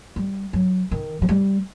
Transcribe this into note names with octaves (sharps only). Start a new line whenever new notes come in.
G3
F#3
D#3
F#3
G3